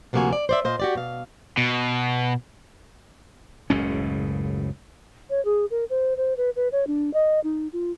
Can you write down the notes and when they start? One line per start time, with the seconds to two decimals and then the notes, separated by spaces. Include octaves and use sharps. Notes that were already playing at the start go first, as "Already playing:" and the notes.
0.13 D2 C3 F3 A#3 F#4 G#5
0.33 D5
0.49 C5 D5 E5
0.65 A#2 C5 D#5 F5
0.80 F#4 G4 D5
0.95 B2 F5
1.58 B2
3.70 F#1 C#2 A2 C#4
5.30 C#5
5.45 G#4
5.71 A#4
5.90 C5
6.17 C5
6.37 B4
6.56 B4
6.72 C#5
6.87 D4
7.14 D#5
7.44 D#4
7.73 F4